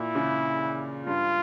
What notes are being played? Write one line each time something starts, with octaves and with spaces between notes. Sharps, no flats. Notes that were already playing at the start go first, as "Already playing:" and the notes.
Already playing: A#2 E4
C#3
G2 F4